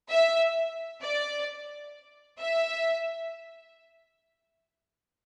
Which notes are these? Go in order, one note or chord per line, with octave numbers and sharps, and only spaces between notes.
E5
D5
E5